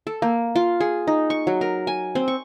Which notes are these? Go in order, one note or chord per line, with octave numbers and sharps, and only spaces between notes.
A4
A#3
F4
G#4
D#4
C#6
F#3
A#4
G#5
C4
C#6